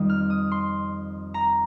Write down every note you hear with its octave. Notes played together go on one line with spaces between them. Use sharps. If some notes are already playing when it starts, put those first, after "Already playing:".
Already playing: F2 D#3 G3 D#6
F6
D#6
C6
A#5